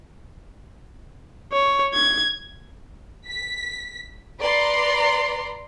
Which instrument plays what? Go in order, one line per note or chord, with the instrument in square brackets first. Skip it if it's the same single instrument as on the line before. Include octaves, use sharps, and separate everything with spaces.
[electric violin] C#5
G#6
[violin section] B6
B4 D5 A#5 C6